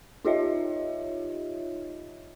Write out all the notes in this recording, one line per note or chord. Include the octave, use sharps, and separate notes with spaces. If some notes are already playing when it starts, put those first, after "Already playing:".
D#4 F4 G4 C#5 D#5 E5